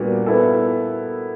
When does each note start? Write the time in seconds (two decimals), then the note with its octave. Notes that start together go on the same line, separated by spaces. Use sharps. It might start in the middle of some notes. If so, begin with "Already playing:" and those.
Already playing: A#2 G3 B3 D4 F#4
0.26 B3 E4 A4